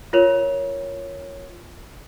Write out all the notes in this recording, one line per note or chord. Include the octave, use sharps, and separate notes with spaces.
F4 A#4 C#5 F7